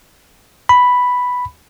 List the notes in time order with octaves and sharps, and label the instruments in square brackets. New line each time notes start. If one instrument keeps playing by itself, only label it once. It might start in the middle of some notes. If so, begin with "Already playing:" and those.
[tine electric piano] B5